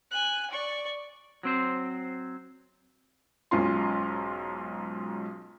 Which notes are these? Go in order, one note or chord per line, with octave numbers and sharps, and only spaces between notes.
G#5 F#6
D5 C#6
F#3 C4 C5
B1 G#2 C#4 F4 C6